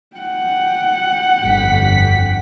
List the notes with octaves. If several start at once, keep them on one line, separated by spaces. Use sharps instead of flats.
F#5 G5
G1 F2 B6